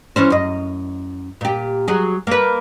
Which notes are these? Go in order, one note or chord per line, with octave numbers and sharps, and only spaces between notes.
E3 C#4 C5
F#2 D#5
A#2 G4
F#3 G#4
A#3 B4